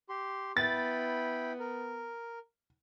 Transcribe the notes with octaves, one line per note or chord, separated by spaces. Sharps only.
G4 C6
B3 E4 G5 B5 A6
A#4